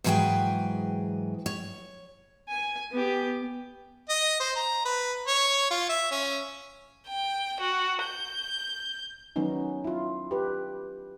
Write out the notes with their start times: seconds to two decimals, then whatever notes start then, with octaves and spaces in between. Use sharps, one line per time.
0.04 G#2 E3 F#3 G#4 B4 G5
1.46 C#5
2.48 G#5
2.91 B3 G4
4.09 D#5
4.40 C5
4.56 A#5
4.85 B4
5.27 C#5
5.71 F4
5.89 E5
6.11 C#4
7.08 G5
7.60 F#4
8.03 G6
9.36 D#3 F#3 B3 C#4 D#4
9.84 E4 F4
10.31 G4 B4